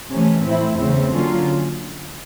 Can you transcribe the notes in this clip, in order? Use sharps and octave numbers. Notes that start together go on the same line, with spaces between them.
C3 E3 A3 C#4
A2 E3 A3 C4 E4
E2 C#3 E3 A3 C4
D3 F#3 A#3 C#4 F4